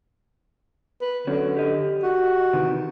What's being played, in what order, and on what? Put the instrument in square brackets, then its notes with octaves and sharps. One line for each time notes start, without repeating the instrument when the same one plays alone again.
[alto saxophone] B4
[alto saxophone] D3 [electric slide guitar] F#3 C#4
[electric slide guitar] G4 D#5
[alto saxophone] F#4
[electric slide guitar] C3 D#3 E3